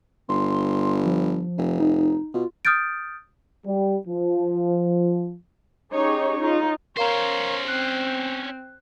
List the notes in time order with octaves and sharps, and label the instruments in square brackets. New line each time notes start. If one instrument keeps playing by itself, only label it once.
[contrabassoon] G1 [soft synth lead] C6
[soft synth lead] F3
[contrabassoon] F1
[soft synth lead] D#4
[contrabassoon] B2 [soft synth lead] F4
[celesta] D#6 F6 G6 A6 D7
[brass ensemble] G3
F3
[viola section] C#4 D#4 G4 G#4 C#5
D#4 F4
[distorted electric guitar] C#4 C5 [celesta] A#4 F5 A#5 [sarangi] C#5
[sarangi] C4 [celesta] F#6